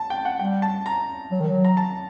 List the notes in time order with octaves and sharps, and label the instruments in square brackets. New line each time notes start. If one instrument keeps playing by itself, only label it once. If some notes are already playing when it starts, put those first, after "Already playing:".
Already playing: [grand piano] A5
G5
F#5
[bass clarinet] G3 [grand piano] G5
[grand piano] A5
A#5
[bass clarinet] F#3
D#3
F#3
[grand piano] A#5
A5